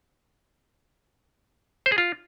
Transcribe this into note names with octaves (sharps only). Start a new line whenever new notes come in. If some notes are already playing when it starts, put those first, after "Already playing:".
C5
G#4
F4